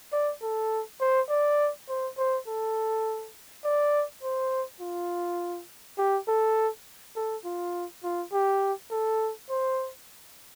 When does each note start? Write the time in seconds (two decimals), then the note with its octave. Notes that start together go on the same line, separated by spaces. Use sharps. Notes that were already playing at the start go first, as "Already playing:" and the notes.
0.12 D5
0.42 A4
1.00 C5
1.29 D5
1.89 C5
2.18 C5
2.47 A4
3.64 D5
4.23 C5
4.80 F4
5.98 G4
6.28 A4
7.16 A4
7.44 F4
8.03 F4
8.32 G4
8.91 A4
9.50 C5